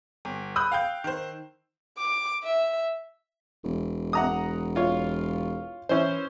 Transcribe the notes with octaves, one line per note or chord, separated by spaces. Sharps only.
G1
B5 D#6 E6 F#6 G6
F5 G5 G6
D#3 C5
D6
E5
E1
F#5 A#5 D#6
F4 C#5
E3 C#4 E4 C5